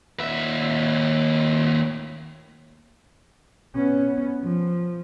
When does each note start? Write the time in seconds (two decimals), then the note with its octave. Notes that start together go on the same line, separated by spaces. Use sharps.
0.20 D#2 E5
3.75 B3 C#4
4.44 F3